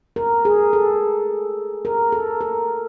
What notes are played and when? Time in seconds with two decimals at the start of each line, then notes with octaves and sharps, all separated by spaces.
0.16 A#4
0.45 G#4
0.73 A4
1.85 A#4
2.12 A4
2.41 A#4